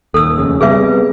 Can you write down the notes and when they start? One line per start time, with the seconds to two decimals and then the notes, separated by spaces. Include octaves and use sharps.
0.14 D#1 D#2 A4 E6
0.38 F1 C#3
0.61 C3 G3 B3 G#4 B4 E5